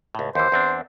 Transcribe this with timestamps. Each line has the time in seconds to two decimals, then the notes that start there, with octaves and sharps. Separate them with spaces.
0.15 C#2 A2
0.35 D#2 E3 C5
0.52 E2 C4 D4